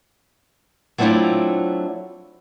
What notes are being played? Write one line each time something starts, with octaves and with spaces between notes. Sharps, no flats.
F#3 A3 C4 D4 E4 F4